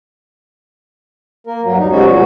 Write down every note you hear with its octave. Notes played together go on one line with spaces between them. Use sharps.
A#3 A#4
G2 F#3
D#2 D#4
B2 F3 G3 G#3 C#4 F#4
D2 A#2 F#4